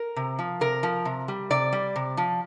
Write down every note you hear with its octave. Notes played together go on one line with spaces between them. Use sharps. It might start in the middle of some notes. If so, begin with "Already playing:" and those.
Already playing: A#4
C3
F3
C3 A#4
F3
C3
G3
C3 D5
G3
C3
F3